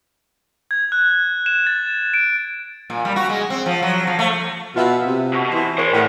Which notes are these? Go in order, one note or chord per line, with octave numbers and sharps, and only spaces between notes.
G#6
F#6
E7
A6
D7
A#2
G3
F#4
G#3
C4
F3
F#3
F3
A3
B2 F4 E5 F#5
C3
B2
E3 C5
A#4 C5 C#5
E2 A2 F#5 G5